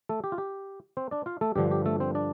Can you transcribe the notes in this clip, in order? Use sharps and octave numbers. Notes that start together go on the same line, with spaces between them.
A3 A4
G4
F4
G4
C4 C5
D4 D5
F4 F5
A3 A4
G2 D3 F3 G4
G4
A3 A4
C4 C5
D4 D5